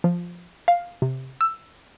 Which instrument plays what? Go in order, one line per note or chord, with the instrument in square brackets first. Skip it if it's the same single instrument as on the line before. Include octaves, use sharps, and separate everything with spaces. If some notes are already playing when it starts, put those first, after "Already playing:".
[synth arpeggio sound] F3
F5
C3
E6